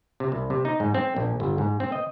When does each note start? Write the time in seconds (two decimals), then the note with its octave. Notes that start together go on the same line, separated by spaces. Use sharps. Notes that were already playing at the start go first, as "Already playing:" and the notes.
0.20 C3
0.32 C2
0.50 C3
0.65 D#4
0.80 G#2
0.94 C4
1.16 A#1
1.40 G1
1.58 G#2
1.80 C4
1.92 D#5